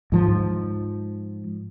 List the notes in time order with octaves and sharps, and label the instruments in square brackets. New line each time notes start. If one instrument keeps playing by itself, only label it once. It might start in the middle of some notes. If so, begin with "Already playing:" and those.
[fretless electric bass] G#2 F3